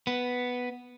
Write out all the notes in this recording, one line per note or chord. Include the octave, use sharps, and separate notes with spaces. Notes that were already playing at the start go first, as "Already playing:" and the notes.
B3